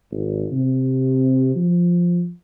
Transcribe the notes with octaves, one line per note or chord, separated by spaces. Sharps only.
G#1
C3
F3